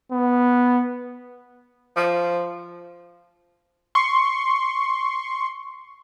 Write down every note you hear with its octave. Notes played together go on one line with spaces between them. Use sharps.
B3
F3
C6 C#6